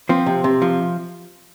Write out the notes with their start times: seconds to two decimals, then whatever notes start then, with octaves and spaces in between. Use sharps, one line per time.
0.09 F3 C4
0.26 C3
0.44 C3
0.62 F3